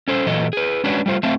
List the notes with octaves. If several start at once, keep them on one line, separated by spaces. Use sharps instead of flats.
C#4 A4 C5
A#2 E3 F#3 A4 D#5
G#4 B4
G#3 C#4 D4 F#4 B4 C#5
G3 A3 F4 C5
F#3 A3 C4 E5 F5 A5